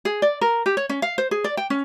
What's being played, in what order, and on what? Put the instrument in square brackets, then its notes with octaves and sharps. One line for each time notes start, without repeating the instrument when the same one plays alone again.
[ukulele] G#4
D5
A#4
G4
C#5
C#4
F5
C5
G#4
D5
G5
C#4